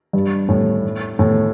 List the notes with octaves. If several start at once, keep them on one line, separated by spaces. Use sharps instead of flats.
G2
A2
A2